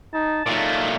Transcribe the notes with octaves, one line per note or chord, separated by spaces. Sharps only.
D#4 A5
A#2 F#3 G#3 A3 D#4 F4